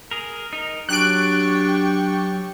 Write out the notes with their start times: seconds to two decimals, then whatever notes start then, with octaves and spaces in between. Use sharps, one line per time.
0.11 G#4 A#4
0.53 D#4 A#4
0.89 F#3 D4 G4 C#6 F#6 D7